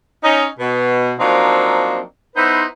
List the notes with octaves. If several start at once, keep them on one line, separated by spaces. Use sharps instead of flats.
C#4 D#4
B2
F3 F#3 A#3 C4 D4 D#4
B3 D#4 E4 B4 C5